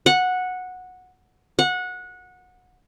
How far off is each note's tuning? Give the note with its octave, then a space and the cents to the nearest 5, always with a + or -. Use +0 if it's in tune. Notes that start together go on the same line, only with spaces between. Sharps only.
F#5 -10
F#5 -20